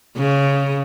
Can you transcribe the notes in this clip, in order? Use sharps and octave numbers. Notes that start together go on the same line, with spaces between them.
C#3